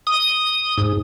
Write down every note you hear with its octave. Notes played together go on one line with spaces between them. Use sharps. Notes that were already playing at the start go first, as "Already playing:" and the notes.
D#6
G#2